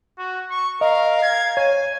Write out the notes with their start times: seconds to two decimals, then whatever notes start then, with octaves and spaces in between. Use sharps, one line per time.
0.18 F#4
0.50 C#6
0.81 A#4 D#5 F5
1.23 G#6
1.57 C#5 G#5